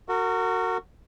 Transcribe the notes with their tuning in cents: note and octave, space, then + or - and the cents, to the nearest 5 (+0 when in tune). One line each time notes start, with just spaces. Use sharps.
F#4 +0 A#4 -35